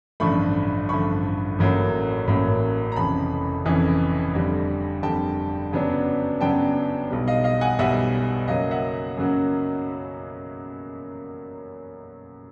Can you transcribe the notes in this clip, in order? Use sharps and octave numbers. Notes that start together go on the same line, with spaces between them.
A1 G2 D3 F3 A3 B5 C#6
A1 G2 D3 F3 A3 B5 C#6
A1 A2 F#3 A#3 C#4
A1 A2 F#3 A#3 C#4
A#5
F1 F2 C#3 E3 A5 B5
F1 F2 C#3 E3
F2 D3 G3
F2 D3 G3 G5 A5
F#2 C#3 F#3 B3 D4
F#2 C#3 F#3 B3 D4 G5 A5
B1 B2 G3
D#5 F5
D#5 F5
F#5 G#5
B1 B2 G3 E5 F#5
F#2 C#3 F#3 A#3 D#5 F5
E5 F#5
F#2 C#3 F#3 A#3